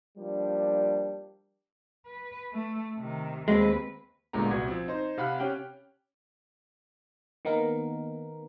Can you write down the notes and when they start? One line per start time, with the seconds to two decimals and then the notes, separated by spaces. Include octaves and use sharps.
0.18 F3 G3 A#3 D4
2.07 B4
2.53 A3
2.96 C3 D#3
3.48 D#2 G#3 C4 B4
4.33 G1 G2 A#2 G#3 B3 A#5
4.51 C2 F#4 D#6 G#6
4.68 F3 C4
4.88 D#4 C5
5.17 C3 F5 F#5 B5 F6 F#6
5.40 C#4 G4 G5
7.45 D#3 A#3 B3 D#4 A#4